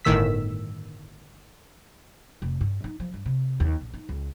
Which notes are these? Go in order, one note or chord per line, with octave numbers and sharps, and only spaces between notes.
G1 A2 D#3 E6 B6
F1
G2
D#4
F3
G2
C3
D#2
A#1
D#4
C#2